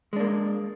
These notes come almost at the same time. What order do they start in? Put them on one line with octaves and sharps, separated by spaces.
G#3 D4 A#3